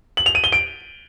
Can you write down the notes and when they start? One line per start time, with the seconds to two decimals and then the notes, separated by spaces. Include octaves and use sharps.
0.17 F#7
0.26 F7
0.35 D#7
0.44 G7
0.53 D7